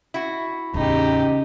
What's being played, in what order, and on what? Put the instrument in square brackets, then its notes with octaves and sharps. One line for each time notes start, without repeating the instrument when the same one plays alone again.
[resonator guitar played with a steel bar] E4 F#4
[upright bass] E2 A2 [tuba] C#3 [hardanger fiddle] D#4 G4